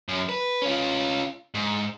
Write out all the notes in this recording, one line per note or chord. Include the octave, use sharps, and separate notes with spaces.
F#2
B4
C#4 F4
G#2